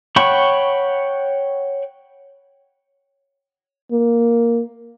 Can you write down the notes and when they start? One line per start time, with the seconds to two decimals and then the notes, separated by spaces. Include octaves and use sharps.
0.16 C#5 F#5 G5 B5 C#6
3.92 A#3